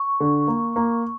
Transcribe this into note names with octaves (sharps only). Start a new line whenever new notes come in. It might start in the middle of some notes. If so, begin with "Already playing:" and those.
Already playing: C#6
D3
A#3
A#3